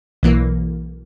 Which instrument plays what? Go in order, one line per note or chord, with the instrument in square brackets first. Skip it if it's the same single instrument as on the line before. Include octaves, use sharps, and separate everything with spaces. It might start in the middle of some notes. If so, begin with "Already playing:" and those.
[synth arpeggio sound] B1 E3 A#3